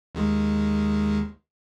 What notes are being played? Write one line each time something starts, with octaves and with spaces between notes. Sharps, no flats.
D#2 D#3 G#3